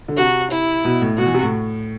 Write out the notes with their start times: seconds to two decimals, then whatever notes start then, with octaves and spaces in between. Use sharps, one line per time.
0.08 D3
0.17 C3 F#4
0.51 E4
0.85 B2
1.02 A2
1.18 B2 F#4
1.26 E3
1.34 C3
1.43 A2